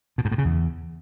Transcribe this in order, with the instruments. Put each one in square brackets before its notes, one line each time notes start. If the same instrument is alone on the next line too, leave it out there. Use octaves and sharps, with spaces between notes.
[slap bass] B2
G#2
A2
C#3
E2